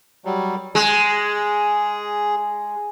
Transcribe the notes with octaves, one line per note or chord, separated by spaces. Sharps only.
F#3 G3
G#3 G#4